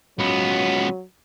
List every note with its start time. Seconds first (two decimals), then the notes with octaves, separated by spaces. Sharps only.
0.19 C#2 F#3 B3